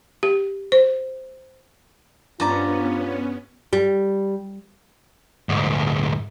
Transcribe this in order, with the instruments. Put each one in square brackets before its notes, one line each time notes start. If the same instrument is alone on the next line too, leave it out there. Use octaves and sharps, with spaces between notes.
[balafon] G4
C5
[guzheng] G2 [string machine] B3 C#4 [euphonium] F4 [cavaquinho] C5 D5 A#5
[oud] G3
[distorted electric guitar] D2 G#2